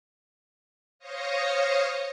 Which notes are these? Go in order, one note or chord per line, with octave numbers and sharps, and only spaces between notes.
C5 C#5 F5 D#6 A#6 C#7